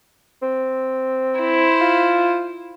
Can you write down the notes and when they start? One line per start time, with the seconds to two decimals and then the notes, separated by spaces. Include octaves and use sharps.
0.42 C4
1.39 E4 C5
1.81 F4